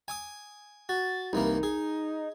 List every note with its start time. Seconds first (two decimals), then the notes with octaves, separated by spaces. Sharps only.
0.08 G#5 D6 D#6
0.89 F#4 A6
1.33 C2 E3 A#3 D#4
1.63 G#4